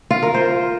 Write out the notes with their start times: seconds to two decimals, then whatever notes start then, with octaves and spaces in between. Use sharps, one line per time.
0.11 F4
0.22 A#4
0.34 C5